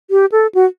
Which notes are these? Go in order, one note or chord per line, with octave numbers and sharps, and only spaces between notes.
G4
A4
F#4